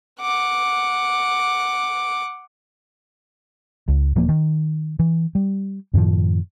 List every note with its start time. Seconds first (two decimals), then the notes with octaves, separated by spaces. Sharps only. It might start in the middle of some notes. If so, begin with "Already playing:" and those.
0.21 F#5 D6
3.88 C#2
4.16 D#1 F3 A#3
4.29 D#3
4.99 E3
5.35 G3
5.94 F#2 A2 D#3 F3